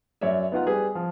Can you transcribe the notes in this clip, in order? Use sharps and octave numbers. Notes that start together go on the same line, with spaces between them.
F#2 C#5 D5 E5
B3 D#4 F4 F#5
G3 G#4 B4
F3